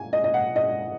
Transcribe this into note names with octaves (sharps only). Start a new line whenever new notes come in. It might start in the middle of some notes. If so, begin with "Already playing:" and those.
Already playing: G#5
D#5
D#5
F#5
D#5